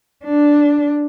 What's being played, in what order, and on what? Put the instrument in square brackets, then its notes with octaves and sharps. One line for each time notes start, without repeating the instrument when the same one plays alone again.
[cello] D4